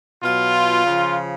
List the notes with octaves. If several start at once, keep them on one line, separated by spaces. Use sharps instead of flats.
B2 F#3 F4
C#3 F3